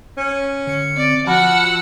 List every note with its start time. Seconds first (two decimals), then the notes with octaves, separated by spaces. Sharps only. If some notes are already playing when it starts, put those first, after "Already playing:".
0.17 C#4
0.67 D3 C#7
0.97 C4 D5
1.27 F3 F#4 F#5 A5 B5 E6 F6